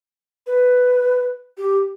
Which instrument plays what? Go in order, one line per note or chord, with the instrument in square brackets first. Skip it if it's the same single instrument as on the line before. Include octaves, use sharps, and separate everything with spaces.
[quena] B4
G4